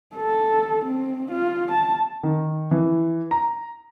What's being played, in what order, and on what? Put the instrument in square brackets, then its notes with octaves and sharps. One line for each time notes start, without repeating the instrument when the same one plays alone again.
[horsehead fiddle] A4
C4
F4
A5
[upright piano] D#3
E3
A#5